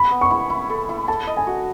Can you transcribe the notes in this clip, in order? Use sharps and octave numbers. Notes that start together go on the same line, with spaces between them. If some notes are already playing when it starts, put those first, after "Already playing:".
Already playing: B5
B3
C#6
E4
E4
A4
E4
A4 A5
D#5
G#5
F#4